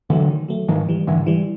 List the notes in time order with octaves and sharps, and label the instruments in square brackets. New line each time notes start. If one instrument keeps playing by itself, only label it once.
[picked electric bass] D3 E3 [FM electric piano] F#3 A3
[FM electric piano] D#3
F#3 A3
[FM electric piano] G#2 [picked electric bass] D#3 F3
[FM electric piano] E3 G3
[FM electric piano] G#2 [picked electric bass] D3 E3
[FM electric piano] E3 G3